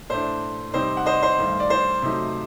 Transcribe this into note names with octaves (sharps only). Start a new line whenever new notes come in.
A2 A3 D4 C5
C3 G3 C4 D#4 C5
F#5
C5 D#5
C5
G2 D#3 A3
D5
C5
C3 F#3 A3 D#4